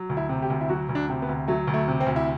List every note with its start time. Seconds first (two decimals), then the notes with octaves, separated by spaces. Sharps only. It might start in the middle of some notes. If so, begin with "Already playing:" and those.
Already playing: F#3
0.09 D2
0.17 E4
0.29 C3
0.42 G4
0.50 D2
0.61 E4
0.69 F#3 F#4
0.89 D2
0.95 D4
1.09 C3
1.22 B3
1.28 D2
1.48 F#3 A3
1.67 D2
1.74 A3
1.88 C3
2.00 C4
2.06 D2
2.16 E4